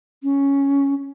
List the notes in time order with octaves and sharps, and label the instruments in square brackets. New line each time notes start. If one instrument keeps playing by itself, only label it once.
[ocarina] C#4